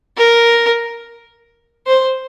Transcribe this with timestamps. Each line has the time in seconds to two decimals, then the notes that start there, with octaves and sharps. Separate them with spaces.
0.17 A#4
1.87 C5